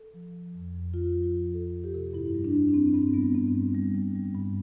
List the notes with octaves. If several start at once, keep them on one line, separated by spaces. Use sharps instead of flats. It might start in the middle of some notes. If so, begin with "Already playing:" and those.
Already playing: A4
F3
F3
F2
F2
F2 F4
F3
F4
F3
F2 A4
F2
G4
C3 A4
G4
G2 E4
G3
D4
G2
D4
G2 C4
G2 C4
G3 B3
G2 C4
G3
G3
G3
G3
G2